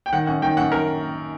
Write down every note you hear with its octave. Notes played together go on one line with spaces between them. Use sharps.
G5
D#3 F#5
F#2 F#5
D#3 G5
F#2 F#5
D#3 A#4